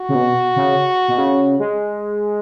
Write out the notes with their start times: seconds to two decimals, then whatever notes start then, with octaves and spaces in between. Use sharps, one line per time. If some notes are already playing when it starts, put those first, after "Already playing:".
Already playing: F#4
0.09 C#3
0.15 B2
0.56 C#3
1.08 B2
1.18 C#3
1.60 G#3